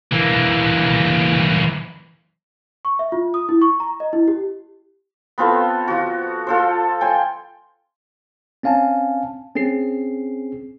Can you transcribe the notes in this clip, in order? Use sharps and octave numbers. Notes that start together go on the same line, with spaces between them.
E3 A#3
C#6
E5
F4
D#6
E4
C#6
A#5
D#5
E4
G4
B3 C4 F4 A4
F3 F#4
F4 A4 C5
G5 G#5 C6
C4 C#4 F5 G#5 A5
C4 C#4 G#4 C7